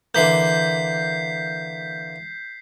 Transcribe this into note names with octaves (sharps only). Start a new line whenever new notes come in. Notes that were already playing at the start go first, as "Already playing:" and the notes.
D3 E3 A#3 G6 B6 C7